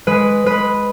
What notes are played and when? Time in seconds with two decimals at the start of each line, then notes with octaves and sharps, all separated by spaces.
0.07 G#3 B4
0.46 G#3 B4